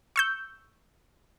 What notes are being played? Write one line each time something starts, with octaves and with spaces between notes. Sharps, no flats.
C#6 E6 G6